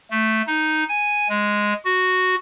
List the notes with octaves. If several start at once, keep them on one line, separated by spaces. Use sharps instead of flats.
A3
D#4
G#5
G#3
F#4